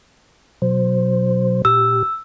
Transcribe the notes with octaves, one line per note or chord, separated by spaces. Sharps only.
B2 F#3 C5
A#2 G4 E6